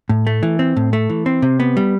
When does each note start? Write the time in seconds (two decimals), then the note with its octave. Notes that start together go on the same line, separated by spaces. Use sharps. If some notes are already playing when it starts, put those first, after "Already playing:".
0.09 A2
0.27 A3
0.43 E3
0.59 C4
0.77 A2
0.93 A3
1.10 E3
1.26 C4
1.42 C3
1.60 B3
1.77 G3